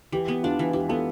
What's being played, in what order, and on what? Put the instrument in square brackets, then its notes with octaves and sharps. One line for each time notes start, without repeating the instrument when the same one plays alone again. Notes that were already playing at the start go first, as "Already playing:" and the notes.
[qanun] E3 [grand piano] G4
[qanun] B3
[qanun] D4 [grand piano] F4
[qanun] E3
[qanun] E3 [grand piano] G4
[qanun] B3 [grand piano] F4 A4